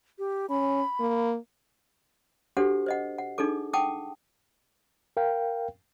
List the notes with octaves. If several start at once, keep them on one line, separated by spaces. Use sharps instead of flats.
G4
C#4 B5
A#3
D4 F#4 G4 A4 C5 F#5
C5 D#5 F#5
F#5
D4 D#4 G#4 A4 D6
F#5 G5 A5 D6 D#6
A#4 F5 G5